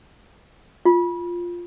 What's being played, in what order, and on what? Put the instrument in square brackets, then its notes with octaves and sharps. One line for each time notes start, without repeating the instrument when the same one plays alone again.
[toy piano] F4